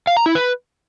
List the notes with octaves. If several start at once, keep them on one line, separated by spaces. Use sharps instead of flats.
F5
A#5
E4
B4